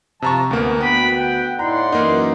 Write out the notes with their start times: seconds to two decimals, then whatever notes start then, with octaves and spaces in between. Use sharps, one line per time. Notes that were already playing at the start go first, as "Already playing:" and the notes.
0.22 C3 F3 A5 A#5 C#6
0.51 D2 A#3 B3
0.80 D2 B3 F#5 G5 B5
1.17 F#5 G5
1.59 A2 D#4 E4 D5 F#5 A#5 C6
1.92 F#2 E3 A#3 D#4